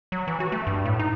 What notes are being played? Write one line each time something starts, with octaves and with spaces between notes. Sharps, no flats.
F#3
E3
F#4
A3
G2
A2
D#4